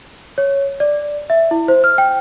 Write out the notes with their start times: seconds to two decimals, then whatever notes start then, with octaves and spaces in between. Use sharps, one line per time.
0.38 C#5
0.80 D5
1.30 E5
1.51 E4
1.68 C5
1.84 F6
1.98 G5